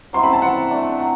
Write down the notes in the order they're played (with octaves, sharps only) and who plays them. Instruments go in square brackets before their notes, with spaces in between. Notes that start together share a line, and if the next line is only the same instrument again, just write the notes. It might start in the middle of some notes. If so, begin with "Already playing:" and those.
[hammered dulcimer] F#3 C4 E4 [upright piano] C6
[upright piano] B5
A5
[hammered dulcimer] F#3 C4 E4 [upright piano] F#5
[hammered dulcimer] F#3 A3 D4
F#3